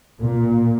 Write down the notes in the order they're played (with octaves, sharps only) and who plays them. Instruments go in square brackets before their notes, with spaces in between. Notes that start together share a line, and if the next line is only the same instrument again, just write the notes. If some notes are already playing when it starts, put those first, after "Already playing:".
[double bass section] A#2